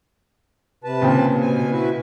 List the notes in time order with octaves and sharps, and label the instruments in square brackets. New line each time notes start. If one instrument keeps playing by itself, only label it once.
[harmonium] C3 B4 A5
[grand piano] A#2 C#3 C4
[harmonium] B2 G#5
E4 F#4 B4